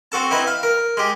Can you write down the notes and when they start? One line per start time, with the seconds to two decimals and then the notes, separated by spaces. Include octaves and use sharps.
0.12 C4 F#4 A4 A5
0.31 C4 D#4 E4 B4
0.47 F5
0.63 A#4
0.97 G#3 G4